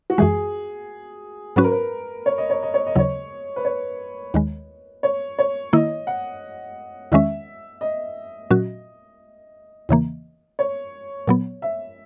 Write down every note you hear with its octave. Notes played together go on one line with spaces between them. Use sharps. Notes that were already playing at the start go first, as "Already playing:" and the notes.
F#4
F#2 E3 G#3 G#4
G#2 F#3 C#4 F#4 B4
A#4
B4
C#5
D#5
C#5
D#5
C#5
D#5
D#2 C#3 F#3 C#5
B4
C#5
D#2 D#3 G#3
C#5
C#5
D#3 A#3 E4 D#5
F#5
E2 D#3 G#3 C#4 E5
D#5
A#2 F#3 C#4 F#4
E2 C#3 E3 A#3
C#5
A#2 F#3 B3
E5